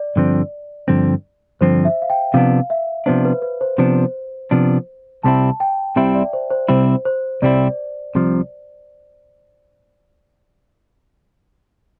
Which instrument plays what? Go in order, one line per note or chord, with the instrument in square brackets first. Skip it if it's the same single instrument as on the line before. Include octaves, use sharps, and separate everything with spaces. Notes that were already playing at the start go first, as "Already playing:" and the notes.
Already playing: [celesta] D5
[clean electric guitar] G2 D3 F3 C4
G2 D3 F3 C4
[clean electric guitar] G2 D3 F3 C4 [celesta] C5
[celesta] E5
F5
G5
[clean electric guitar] C3 F3 B3 D4 [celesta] F5
[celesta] E5
[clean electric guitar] C3 F3 B3 D4 [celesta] C5
[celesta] B4
B4
C5
[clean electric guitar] C3 F3 B3 D4 [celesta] C5
[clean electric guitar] C3 F3 B3 D4
[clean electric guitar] C2 C3 G3 C4 E4 [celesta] A5
[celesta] G5
[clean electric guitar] C2 C3 G3 C4 E4 [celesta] E5
[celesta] D5
C5
C5
[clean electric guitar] C2 C3 G3 C4 E4 [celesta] C5
[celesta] C5
[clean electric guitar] C2 C3 G3 C4 E4 [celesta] D5
[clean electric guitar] C2 C3 F3